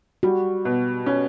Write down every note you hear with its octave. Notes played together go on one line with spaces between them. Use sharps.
G3 F#4
B2
C#4